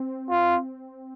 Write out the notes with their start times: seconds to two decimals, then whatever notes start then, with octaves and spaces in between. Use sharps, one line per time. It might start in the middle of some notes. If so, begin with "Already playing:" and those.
Already playing: C4
0.30 F4